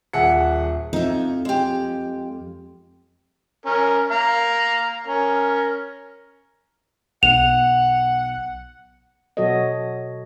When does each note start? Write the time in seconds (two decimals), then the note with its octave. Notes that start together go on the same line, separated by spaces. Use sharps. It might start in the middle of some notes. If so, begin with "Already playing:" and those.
0.13 D#1 G#4 E5 F#5 C#7
0.93 F2 D#4 E5
1.45 G#3 G4
3.66 C#4 A#4
4.11 F5 A#5
5.07 C#4 A#4
7.23 B1 F#5 F7
9.37 B2 F#3 F#4 A4 C#5 D#5